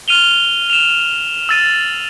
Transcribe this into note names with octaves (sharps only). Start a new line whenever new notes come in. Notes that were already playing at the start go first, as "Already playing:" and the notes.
F6 D#7 F7 G7
E7 F7
E6 A6 D#7